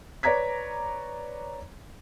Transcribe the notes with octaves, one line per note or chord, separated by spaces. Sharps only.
B4 C#5 D5 A#5 G#6 B6